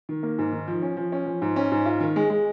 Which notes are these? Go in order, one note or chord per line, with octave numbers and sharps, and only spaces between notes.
D#3
A#3
G#2
D#3
F3
C#4
F3
C#4
F3
G#2
C#4
G#2
F4
D#3
G#3
G#3